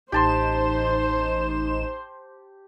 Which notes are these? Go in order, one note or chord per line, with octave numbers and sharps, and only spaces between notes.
A1 D#4 G4 C5 A5 C6 E7